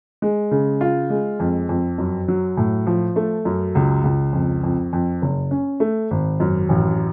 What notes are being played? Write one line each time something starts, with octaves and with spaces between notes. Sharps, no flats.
G#3
C#3
F4
G#3
F2
F2
F#2
F#3
A2
F3
A3
F#2
C#2
C#2
F2
F2
F2
F#1
C#4
A3
G#1
F#2
A1